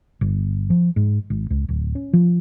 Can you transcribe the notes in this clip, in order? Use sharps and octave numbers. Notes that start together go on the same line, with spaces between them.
G1
F3
G#2
G#1
C#2
D1
C#4
F3